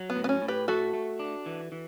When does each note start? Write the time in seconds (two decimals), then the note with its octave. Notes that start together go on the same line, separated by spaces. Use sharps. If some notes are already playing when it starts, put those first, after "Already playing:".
Already playing: F#3
0.10 B3
0.16 A2
0.24 B3
0.29 C#4
0.42 A2
0.48 G4 B4
0.68 A3 F#4 A4
0.93 A3
1.19 D4
1.46 E3
1.72 E3